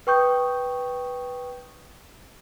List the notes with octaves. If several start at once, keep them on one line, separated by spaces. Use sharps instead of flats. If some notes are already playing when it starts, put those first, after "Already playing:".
B4 G5 C#6 D#6 G6